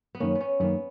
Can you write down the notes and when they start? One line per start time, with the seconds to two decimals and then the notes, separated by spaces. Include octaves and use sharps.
0.15 B3
0.20 F#2 D#3 A#3 C#4
0.35 B3
0.41 C#4
0.60 F#2 D#3 A#3 B3